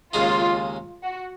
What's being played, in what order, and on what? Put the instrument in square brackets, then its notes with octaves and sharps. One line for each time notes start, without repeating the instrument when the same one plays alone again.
[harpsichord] D#2 C#3 G#3 D#4 [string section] F4
[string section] F#4